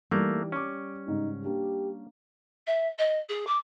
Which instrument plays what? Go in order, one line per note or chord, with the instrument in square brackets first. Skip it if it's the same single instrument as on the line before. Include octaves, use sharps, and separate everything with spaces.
[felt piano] E3 D#4 [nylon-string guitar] G3 [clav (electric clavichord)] A3 A#3
[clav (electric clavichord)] C#4 [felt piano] C#6 D6
[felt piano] G#2 C#3 [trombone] D#4
[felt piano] A#3 D4 [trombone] G4
[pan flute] E5
D#5
G#4
D6